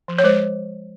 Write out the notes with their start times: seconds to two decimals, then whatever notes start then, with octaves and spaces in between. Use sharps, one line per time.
0.08 F3
0.18 C#5
0.24 G#3 C5